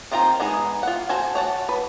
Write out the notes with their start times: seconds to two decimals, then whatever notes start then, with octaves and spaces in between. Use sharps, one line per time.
0.11 D#3 C4 F4 C5 A#5
0.40 G#3 B3 D#4 G#4
0.83 F4 F#5
1.09 F#4 A4 C5 G#5
1.35 C#5 F#5 A5
1.69 B4